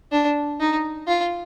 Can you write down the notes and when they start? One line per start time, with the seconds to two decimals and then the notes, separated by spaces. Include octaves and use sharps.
0.12 D4
0.60 D#4
1.08 F4